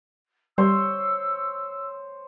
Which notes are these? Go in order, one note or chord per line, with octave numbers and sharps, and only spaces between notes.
G3 C5 C#5 E6